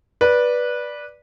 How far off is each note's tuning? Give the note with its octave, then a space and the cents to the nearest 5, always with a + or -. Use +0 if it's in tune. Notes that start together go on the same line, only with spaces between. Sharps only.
B4 -15 D5 +0